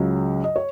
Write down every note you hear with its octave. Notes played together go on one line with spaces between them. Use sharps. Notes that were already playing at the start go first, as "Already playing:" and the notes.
Already playing: C#2 C#3 F#3
D#5
C#5